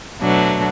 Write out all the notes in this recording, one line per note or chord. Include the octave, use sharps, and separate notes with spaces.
B2 F#3 A3 D4